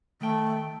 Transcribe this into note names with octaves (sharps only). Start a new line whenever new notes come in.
D#3 A3 G5